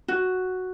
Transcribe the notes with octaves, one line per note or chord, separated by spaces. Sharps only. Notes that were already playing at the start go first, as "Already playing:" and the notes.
F#4